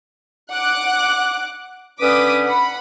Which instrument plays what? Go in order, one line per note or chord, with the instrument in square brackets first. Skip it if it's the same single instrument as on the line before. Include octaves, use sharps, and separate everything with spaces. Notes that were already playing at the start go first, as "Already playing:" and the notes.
[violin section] F#5 D6 F#6
[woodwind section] D3 C#4 B4 [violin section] D6 D#6 B6
[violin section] F#5 B5